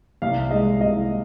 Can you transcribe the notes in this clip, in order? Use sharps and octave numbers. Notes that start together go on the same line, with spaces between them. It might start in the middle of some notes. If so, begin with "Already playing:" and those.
C2 F5
G#3 D#5
C2 D#5